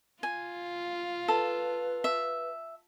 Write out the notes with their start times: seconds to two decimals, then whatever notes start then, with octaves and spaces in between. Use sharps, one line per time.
0.23 F4 G#5
1.28 A4 B4
2.04 E5